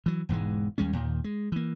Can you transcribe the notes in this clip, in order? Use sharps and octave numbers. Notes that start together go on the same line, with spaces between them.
E3 F#3
E1 G#2 E3 G#3
D#2 G3 G#3 C#4
D#2 A#2 D#3
G#3
E3 A#3